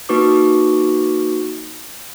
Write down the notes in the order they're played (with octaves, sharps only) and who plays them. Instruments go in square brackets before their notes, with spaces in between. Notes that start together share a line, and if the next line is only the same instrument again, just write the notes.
[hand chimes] A#3 D#4 F#4 B4 C#6 D6